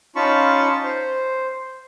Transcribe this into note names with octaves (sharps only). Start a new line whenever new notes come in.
C#4 D#4 F4 A5 B5 C#6
C5